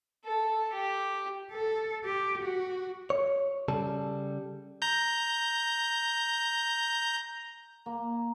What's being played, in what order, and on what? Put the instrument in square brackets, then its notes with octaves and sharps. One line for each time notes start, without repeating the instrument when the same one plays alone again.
[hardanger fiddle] A4
G4
[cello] A4
G4
F#4
[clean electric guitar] C#5
C#3 G3 A4
[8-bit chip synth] A#5 G6
[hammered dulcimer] A#3